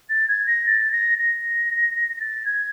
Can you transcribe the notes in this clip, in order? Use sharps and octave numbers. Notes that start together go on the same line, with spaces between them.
A6
G#6
A#6
A6
A#6
A#6
A6
G#6